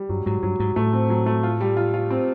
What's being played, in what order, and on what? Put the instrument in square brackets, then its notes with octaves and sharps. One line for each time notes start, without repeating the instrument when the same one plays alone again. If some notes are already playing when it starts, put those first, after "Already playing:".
Already playing: [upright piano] G3
[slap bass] G2 [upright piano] F#3
[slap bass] G#2 [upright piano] F#3
[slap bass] G2 [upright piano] F#3
[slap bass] G#2 [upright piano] F#3
[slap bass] A2 [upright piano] A3
[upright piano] C4
F#3
A3
F4
G3
F4
F4
C4